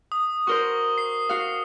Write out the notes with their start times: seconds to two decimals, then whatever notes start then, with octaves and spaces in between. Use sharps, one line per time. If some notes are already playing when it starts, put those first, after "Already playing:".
0.12 D#6
0.47 F#4 A#4 C5 C#6 G7
0.98 C7
1.29 F#4 F5